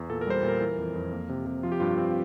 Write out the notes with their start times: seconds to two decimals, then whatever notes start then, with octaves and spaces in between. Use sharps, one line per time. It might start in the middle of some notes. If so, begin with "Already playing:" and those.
Already playing: E2
0.10 A#2 A4
0.21 A#4
0.27 G3 C5
0.35 A#4
0.43 A#2
0.48 A#4
0.60 E3
0.78 F2
0.96 F2
1.13 A#3
1.29 C3
1.47 C3
1.63 F3 F4
1.72 G4
1.80 G2 F4
1.98 C4